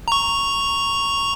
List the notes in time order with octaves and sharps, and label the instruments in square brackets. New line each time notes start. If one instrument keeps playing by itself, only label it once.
[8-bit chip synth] A#5 C#6